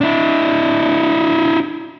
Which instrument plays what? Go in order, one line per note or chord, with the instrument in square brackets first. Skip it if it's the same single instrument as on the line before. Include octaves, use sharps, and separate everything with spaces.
[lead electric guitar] D4 E4